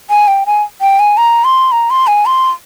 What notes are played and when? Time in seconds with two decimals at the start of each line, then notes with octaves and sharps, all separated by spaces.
0.10 G#5
0.28 G5
0.46 G#5
0.81 G5
0.99 G#5
1.17 A#5
1.44 C6
1.72 A#5
1.90 C6
2.07 G#5
2.26 C6